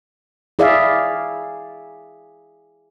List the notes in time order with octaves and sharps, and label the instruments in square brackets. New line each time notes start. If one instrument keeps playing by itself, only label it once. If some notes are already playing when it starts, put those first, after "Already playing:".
[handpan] E4 G#4 D5 E5 F5